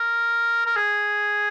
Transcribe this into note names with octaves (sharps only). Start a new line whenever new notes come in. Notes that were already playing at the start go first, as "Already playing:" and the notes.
Already playing: A#4
A#4
G#4